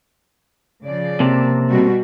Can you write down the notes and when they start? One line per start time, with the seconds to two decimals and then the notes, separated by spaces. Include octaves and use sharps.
0.83 C#3 F3 D5
1.20 C3 A#3 C4 A5
1.68 B2 G3 F#4